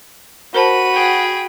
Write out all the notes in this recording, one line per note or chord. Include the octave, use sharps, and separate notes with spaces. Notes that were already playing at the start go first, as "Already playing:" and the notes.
F#4 A#4 C5 A5 B5 D#7
G#4 G5